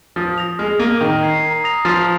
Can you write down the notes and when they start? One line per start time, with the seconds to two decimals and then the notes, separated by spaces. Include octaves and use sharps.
0.16 F3 D#6
0.38 A#6 F7
0.59 G#3 F6
0.79 A#3 A#6 D#7
1.01 D#3 A#5
1.23 G#6 C7
1.43 A#5
1.64 D#6 A#6 F7
1.85 F3 C6